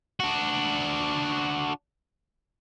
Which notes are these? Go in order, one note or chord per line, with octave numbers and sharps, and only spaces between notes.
D4 F#4